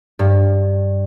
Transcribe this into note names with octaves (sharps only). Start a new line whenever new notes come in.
G2